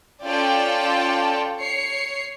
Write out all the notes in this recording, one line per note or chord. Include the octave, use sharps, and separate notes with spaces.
C#4 F4 A4 D5 G5 A5
C#5 C7 C#7